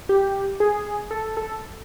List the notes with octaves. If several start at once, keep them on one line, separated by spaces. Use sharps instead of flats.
G4
G#4
A4
A4